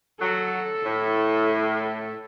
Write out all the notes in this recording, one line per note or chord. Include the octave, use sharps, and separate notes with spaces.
F#3 A4
A2